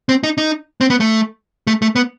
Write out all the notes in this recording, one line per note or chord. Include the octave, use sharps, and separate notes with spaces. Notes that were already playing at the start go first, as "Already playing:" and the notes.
C4
D#4
D#4
C4
B3
A3
A3
A3
B3